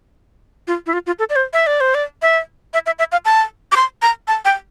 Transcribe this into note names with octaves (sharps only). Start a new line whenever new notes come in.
F4
E4
F4
F4
A4
D5
C5
E5
D5
C5
D5
E5
E5
E5
E5
F5
A5
D6
C6
A#5
A5
G5